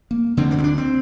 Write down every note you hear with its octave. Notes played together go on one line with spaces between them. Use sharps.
A#3
D2 D3 C4
A#3
C4
D4
C4